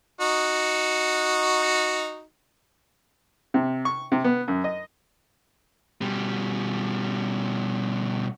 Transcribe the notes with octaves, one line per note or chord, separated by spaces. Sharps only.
D#4 F#4
C3
C#6
C3
B3
F#2
D#5
B2 G3